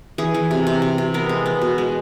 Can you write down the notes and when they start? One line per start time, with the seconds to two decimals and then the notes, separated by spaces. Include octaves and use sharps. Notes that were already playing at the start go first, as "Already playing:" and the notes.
0.18 E3 G#4
0.34 E3
0.51 C3
0.67 C3
0.82 C3
0.98 C3
1.14 B3 A#4
1.29 G#3
1.46 B3
1.61 B2
1.78 G#3